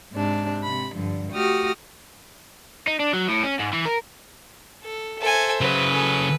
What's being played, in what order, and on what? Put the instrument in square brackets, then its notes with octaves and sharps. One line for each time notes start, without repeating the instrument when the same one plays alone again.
[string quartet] G#2 C3 D4
C3 B5
G2 D3 F3
A3 F#4 G4 D#6 F6 A#6
[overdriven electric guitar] D#4
D4
F#3
A2
C#4
G#2
E3
A#4
[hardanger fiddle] A4
[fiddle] A4 G#5 [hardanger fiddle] C5 E5
[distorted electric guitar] C#3 F#3 [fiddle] B4
[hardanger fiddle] A4 G#5